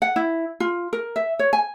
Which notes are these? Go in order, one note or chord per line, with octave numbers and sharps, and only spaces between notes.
F#5
E4
F4
A#4
E5
C#5
G#5